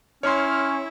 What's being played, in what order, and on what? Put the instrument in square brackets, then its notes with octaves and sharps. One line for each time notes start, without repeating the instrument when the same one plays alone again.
[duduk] C#4 [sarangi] E4 [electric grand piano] C#5 C6 [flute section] F6